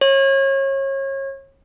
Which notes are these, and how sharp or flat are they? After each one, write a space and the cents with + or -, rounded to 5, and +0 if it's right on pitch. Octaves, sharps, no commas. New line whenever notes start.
C#5 -30